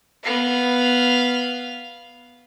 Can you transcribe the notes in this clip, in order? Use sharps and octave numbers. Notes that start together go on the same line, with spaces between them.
B3 F5